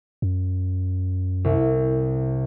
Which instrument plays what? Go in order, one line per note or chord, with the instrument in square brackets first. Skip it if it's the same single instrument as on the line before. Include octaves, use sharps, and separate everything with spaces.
[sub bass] F#2
[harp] C2